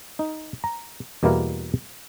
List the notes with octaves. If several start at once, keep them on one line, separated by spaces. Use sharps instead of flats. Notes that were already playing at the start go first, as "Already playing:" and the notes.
D#4
A#5
E2 B2 G3 A#3 E4 A#4